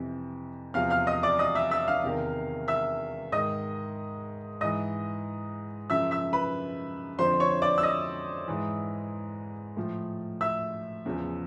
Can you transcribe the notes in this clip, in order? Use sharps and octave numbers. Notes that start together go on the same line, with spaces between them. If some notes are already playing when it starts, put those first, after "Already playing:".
Already playing: F2 C3 E3
E2 C3 F3 F5 F6
F5 F6
D#5 D#6
D5 D6
D#5 D#6
E5 E6
E5 E6
F5 F6
E2 C3 D#3
E5 E6
G#2 D#3 D#5 D#6
G#2 E3 D#5 D#6
F#2 C#3 F3 E5 E6
E5 E6
B4 B5
F2 D3 F3 C5 C6
C#5 C#6
D5 D6
E6
D#5 D#6
G#2 E3
A2 F3
E5 E6
E2 C#3 F3